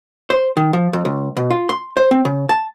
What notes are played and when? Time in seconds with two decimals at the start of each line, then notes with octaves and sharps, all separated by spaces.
0.30 C5
0.57 D#3
0.73 F3
0.93 F2
1.05 C#2
1.37 B2
1.50 F4
1.69 C6
1.97 C5
2.11 C4
2.25 C#3
2.49 A5